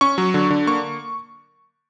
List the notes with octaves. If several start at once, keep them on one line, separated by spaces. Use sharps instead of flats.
C#4 C#6
F#3
D3
D3
A#3 C#6